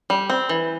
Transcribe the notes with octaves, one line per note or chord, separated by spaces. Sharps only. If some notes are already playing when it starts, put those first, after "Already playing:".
G3
C4
E3